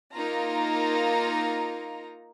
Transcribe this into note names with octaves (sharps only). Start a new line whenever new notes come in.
A#3 D#4 F4 A#5